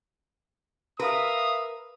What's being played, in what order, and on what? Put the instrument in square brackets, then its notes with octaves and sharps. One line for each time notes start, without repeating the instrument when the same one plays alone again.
[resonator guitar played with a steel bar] A#4 B4 [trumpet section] E5 F5 D#6